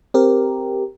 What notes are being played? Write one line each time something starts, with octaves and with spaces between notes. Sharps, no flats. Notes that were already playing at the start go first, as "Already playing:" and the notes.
C4 G4 A#4